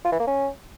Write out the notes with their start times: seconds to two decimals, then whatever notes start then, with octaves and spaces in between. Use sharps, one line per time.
0.05 F4
0.12 E3
0.20 A#3
0.27 C#4